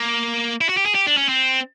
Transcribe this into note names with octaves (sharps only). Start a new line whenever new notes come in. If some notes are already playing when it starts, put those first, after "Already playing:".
Already playing: A#3
E4
F#4
G4
G#4
G4
D4
C#4
C4